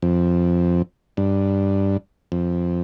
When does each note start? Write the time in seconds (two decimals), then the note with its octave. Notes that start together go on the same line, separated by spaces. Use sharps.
0.02 F2
1.17 G2
2.32 F2